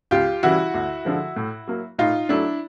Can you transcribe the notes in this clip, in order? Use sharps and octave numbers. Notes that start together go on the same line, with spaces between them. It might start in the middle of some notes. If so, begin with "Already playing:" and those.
C#2 F4 G4
C#3 E3 G3 E4 F#4
D2
D3 F3 G#3
A2
F#3 A#3
A2 D#4 F4
F#3 A3 D4 E4